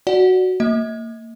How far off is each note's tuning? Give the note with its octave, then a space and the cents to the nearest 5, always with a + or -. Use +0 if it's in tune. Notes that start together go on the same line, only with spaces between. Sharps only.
F#4 +0 D5 +0 F#5 +0
A#3 -25 D#5 +45